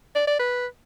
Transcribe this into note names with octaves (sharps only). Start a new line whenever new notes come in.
D5
D5
B4